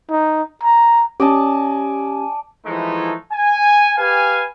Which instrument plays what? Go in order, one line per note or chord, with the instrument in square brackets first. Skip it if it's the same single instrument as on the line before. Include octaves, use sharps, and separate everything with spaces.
[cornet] D#4
A#5
[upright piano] C#4 [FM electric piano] G4 [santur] D5 D#5 A5 [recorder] G#5
[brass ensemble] E3 F3 G#3 A3 D#4 E4
G#5
G4 B4 F5 G#5